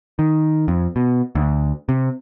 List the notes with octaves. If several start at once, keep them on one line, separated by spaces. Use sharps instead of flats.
D#3
F2
B2
D2
C3